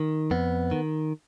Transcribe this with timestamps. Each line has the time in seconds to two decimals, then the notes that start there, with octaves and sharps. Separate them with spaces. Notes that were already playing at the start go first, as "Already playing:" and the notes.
Already playing: D#3
0.31 F2 B3
0.71 D#3